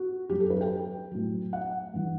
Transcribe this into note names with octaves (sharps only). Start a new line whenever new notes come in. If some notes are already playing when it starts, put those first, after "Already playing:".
Already playing: F#4
F#2 F#3 G4
A4
B4
G5
A2 F#3
F#5
G2 E3